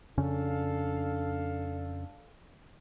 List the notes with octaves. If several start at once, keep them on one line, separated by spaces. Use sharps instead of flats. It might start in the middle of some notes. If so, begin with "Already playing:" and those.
F2 C#3 C#4 D4 A4 F5